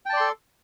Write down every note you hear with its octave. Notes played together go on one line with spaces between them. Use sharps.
A4 D5 G5 A5 C6